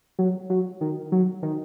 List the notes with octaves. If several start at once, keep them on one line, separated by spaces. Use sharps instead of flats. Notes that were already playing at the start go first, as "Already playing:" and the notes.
F#3
F#3
D#3
F#3
D#3